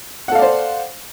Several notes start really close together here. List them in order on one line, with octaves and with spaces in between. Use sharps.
F#5 A4 F5 D5 C5